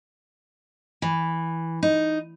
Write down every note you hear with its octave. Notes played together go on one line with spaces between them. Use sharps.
E3
D#4